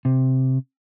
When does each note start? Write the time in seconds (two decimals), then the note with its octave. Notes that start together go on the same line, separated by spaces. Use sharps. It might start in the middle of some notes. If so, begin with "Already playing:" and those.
0.05 C3